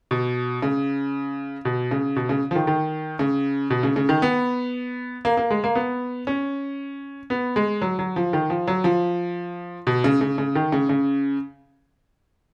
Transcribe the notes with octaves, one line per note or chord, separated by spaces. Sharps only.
B2
C#3
B2
C#3
B2
C#3
F3
D#3
D#3
C#3
B2
C#3
C#3
D#3
B3
A#3
A#3
G#3
A#3
B3
C#4
B3
G#3
F#3
F#3
F3
D#3
F3
F#3
F3
B2
C#3
C#3
C#3
D#3
C#3
C#3